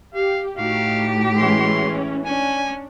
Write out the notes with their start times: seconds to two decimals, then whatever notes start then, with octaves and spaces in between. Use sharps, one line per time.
0.14 G4 F5
0.57 A2 D#4 F#4 G4 F5
1.37 E3 G#3 C#4 C6
2.25 C#4 D4 G#5